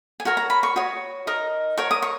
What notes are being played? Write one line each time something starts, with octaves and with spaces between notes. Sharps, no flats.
G#5
F#4 A#4 C#5 A#5
A#5
B5
C#6
F#4 C#5 D#6
D#4 A#4 D#5
F#4 A#4 C#5 C#6
D#6
C#6